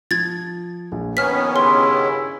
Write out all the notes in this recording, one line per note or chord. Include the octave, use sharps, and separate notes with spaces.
F3 G#6 A6
A#1
D#3 B3 C#4 B4 F6 B6
G2 C#3 E4 C6